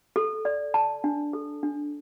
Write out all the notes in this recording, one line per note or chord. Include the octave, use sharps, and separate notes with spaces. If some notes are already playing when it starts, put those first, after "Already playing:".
A4
D5
A5
D4
A4
D4